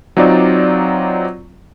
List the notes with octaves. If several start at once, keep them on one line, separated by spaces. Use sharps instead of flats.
F#3 C4 D#4 F4 D5